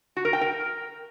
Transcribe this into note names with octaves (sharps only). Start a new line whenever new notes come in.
F#4
A#4
G5
A#4